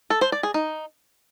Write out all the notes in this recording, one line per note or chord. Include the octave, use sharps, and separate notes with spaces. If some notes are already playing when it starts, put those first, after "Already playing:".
A4
C5
D5
G#4
D#4